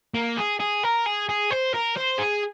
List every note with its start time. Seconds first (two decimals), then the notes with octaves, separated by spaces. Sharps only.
0.14 A#3
0.37 G#4
0.60 G#4
0.83 A#4
1.06 G#4
1.29 G#4
1.51 C5
1.74 A#4
1.97 C5
2.19 G#4